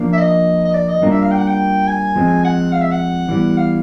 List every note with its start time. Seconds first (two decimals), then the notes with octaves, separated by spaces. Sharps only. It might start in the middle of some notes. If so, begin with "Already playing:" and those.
Already playing: F3 A#3 D4
0.13 E5
0.18 D#5
0.65 D#5
0.74 D5
0.89 D#5
1.02 G3 A#3 D4 F4 A#4
1.11 E5
1.22 F5
1.31 G5
1.38 F#5
1.47 G5
1.87 G#5
2.16 F3 G#3 C4
2.45 F#5
2.73 F5
2.81 E5
2.91 F#5
3.29 E3 G3 B3
3.57 F5